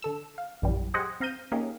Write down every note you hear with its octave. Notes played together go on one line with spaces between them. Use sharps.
D3 A4 E6
F5
A#1 F#2 E3 G3
G4 G#4 C5 D#5 F#5 G#5
C4 F5 A#5 G6 D#7
A#3 C#4 D#4 G4 G#4 A#4